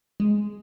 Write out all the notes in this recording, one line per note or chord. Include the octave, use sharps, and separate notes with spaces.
G#3